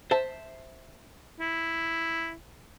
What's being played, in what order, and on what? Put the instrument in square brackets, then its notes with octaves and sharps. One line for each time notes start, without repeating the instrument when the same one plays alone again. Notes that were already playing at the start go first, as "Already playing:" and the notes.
[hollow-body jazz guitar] C5 E5 A5
[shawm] E4